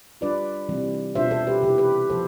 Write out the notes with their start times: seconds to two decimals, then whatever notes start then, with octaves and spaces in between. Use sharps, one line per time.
0.21 G3 D4 F4 B4 D5
0.69 C3 E3 G3 C4
1.15 B2 B3 D4 F4 C5 E5
1.31 A4 C5
1.47 G4 B4
1.62 C3 E3 B3 E4 G4
1.78 G4 B4
2.10 F3 B3 A4 C5